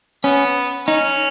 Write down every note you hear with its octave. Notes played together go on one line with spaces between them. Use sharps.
B3 C#4
C#4 D#4